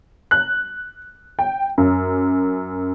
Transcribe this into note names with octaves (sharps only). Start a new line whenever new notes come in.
F#6
G5
F#2